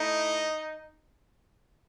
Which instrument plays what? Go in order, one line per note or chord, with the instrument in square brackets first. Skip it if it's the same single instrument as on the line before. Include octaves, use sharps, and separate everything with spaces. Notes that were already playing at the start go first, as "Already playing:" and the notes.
Already playing: [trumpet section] A3 D#4 E4 D#5